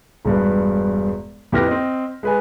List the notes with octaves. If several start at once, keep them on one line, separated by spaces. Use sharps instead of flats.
E1 G2 B4
F2 E4 G4 B4 F6 A#6
C4 D#5
G#3 B4 G#5